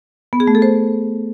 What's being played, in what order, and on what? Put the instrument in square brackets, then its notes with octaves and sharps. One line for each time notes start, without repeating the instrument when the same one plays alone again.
[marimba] B3
G#4
A3
A4
C5